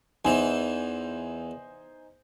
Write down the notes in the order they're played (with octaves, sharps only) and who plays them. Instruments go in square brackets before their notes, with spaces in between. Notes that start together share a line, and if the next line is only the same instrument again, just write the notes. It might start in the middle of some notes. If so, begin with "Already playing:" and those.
[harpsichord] E2 E3 [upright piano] D#4 C5 G#5